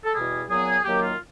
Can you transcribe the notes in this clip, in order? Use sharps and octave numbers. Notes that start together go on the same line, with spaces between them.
A4
E2 B2 G3 G#4
A#2 F#3 B3 G#4
F#2 D#3 F#3 A#3 G4
F4